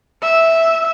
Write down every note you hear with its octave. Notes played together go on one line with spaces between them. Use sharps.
E5